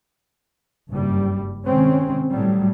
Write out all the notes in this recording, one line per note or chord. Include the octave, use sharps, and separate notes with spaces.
F#1 G2 G3
C3 D#3 G#3 C4 C#4
A2 F#3 G3